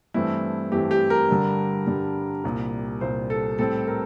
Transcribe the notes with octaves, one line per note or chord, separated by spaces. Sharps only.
G2 E3 A3 C4 E4
G2 E3 A3 C4 G4
G4
A#4
G2 D3 G3
G2 D3 G3
C2 A#2 G3 A#3
C2 A#2 G3 A#3 C5
A4
A2 G3 C4 A4
A#4